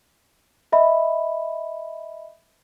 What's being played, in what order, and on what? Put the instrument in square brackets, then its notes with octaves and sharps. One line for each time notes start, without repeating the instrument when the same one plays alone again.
[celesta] D#5 E5 B5